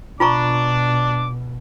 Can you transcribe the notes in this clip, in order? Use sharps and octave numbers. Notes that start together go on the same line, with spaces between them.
B2 D4 F4 A#5 C#6 D6